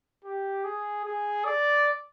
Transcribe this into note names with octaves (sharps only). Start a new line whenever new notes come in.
G4
G#4
G#4
D5